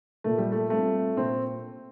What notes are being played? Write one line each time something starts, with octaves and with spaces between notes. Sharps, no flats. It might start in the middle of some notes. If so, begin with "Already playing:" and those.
A#2 A3
G3
A3
G3 A3 C4 F4
A#2 C4